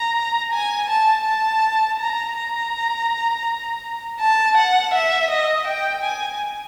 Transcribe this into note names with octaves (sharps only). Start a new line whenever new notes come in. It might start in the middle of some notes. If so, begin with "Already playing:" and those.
Already playing: A#5
G#5
A5
A5
A#5
A#5
A5
F#5
E5
D#5
G5
G#5